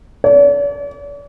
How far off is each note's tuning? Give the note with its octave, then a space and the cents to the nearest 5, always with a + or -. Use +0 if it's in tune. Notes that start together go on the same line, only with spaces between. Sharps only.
D5 -45